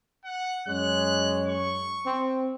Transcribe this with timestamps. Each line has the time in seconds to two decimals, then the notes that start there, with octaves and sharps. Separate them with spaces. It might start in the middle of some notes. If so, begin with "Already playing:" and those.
0.25 F#5
0.68 F#2 G#3 C#5 F#6
1.47 C#6
2.06 C4